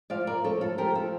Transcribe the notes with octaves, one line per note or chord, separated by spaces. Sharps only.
F3 D5 F5
A#4 D5
F3 A4 C#5
F4 A4
F3 G4 A#4
F4 A4